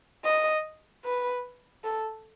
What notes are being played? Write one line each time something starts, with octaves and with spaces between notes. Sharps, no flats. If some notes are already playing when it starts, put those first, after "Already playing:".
D#5
B4
A4